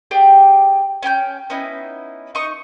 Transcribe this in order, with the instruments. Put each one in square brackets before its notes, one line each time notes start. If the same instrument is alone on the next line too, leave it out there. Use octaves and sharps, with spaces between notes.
[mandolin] G4 G#4 D5 G5
C#4 G5 G#5 G6
B3 C#4 D#4 E4
D#4 C#6 D#6